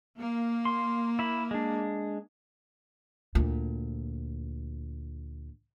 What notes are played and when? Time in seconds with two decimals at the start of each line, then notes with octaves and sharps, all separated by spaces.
0.19 A#3
0.65 C6
1.19 E4 B5
1.51 G#3 D4
3.35 D2 A#2